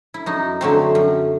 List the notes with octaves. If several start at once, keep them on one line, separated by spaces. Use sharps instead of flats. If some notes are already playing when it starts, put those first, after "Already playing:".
E4
F#2 D#4
D3 F#3 A3 C4
F#2